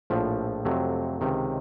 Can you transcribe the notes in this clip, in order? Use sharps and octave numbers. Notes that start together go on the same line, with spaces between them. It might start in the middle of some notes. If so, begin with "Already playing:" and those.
A#1 A2 F3
F2 C3 F#3 A3
C#2 C3 D#3